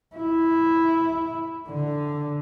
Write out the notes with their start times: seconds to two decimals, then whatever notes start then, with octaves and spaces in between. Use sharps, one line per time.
0.16 E4
1.69 D3